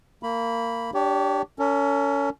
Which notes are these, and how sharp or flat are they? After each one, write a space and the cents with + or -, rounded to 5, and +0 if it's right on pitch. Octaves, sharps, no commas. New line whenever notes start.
A#3 -20 B5 +0
D4 +0 G4 +0 C#5 +35
C#4 +25 A#4 -45